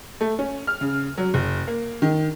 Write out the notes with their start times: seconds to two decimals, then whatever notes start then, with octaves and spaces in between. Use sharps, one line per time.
0.21 A3
0.39 C#4
0.67 F6
0.81 C#3
1.18 F#3
1.34 F#1
1.68 A#3
2.02 D#3